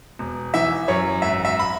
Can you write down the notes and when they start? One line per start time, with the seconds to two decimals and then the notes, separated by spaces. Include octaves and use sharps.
0.19 E1
0.54 E3 E5
0.88 F#2 C#5
1.22 G#1 E5
1.45 E5
1.59 B5